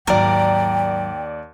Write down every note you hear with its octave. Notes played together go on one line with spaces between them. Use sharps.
D#2 G#2 F#3 A#4 D5 G5